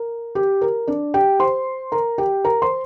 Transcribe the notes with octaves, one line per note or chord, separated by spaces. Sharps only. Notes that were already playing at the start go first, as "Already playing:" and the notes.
Already playing: A#4
G4
A#4
D4 D5
G4 G5
C5 C6
A#4 A#5
G4 G5
A#4 A#5
C5 C6